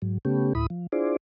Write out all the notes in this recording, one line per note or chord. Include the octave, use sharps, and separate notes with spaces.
G#2 F#3
C#3 A3 B3 C#4 G4
D2 A2 E4 B5 D#6
F3
D4 E4 F4 G#4 C5 D5